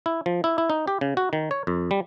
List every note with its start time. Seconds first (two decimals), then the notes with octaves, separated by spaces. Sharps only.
0.06 E4
0.26 F3
0.44 E4
0.58 E4
0.70 D#4
0.88 G4
1.01 C#3
1.17 F#4
1.33 D#3
1.51 C#5
1.67 F2
1.91 G3